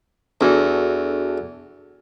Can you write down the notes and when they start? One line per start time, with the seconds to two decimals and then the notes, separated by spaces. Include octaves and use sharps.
0.41 E2 D4 F#4 A4